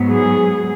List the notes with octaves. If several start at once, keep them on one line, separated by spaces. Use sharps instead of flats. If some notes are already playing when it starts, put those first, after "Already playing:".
Already playing: G#2 F#3 B3
G#4